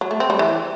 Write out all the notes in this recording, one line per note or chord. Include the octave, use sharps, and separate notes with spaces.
F#3
A3
C4
G3
E3